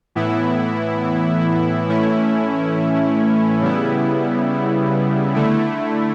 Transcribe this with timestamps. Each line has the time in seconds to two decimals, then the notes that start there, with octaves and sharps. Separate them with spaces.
0.15 A2 E3 B3 E4
1.88 A2 E3 A3 C#4 E4
3.61 C#3 G3 B3 E4
5.35 D3 A3 E4